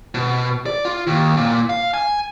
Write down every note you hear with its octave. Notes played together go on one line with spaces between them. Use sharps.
B2
D5
F4
D#2
A#2
F5
G#5